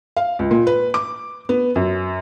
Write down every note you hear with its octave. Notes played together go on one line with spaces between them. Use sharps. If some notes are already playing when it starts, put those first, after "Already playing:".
F5
C#2
A#2
B4
D6
B3
F#2